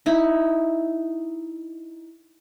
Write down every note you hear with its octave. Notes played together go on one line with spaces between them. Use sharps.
D#4 E4